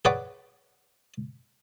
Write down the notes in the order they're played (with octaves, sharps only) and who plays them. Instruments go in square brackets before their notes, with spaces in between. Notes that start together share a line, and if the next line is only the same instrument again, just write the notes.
[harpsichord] G#4 B4 C#5 D5 F#5